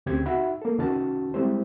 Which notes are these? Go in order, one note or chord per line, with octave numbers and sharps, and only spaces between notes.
D2 C#3 C4 G4 G#6
D#4 F#4 E5 F#5 B5
A#3 A4
C2 D#3 C#4 F#4 A5
G3 G#3 C4 E4 G4 C5